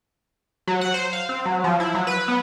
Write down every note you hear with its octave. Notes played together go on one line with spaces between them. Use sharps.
F#3
F#5
C5
F5
C4
F#3
F3
E4
F#3
B4
B3